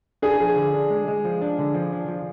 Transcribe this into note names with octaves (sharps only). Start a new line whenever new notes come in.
D4 G#4
F3
D3
D4
G#3
G#3
F3
D4
D3
F3
D4
F3